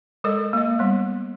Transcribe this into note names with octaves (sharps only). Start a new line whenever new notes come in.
G#3 A4 A#4 D#5
A#3 D#5
G3 B3